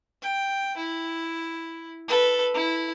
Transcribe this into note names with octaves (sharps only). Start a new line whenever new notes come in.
G5
E4
A4 B4
E4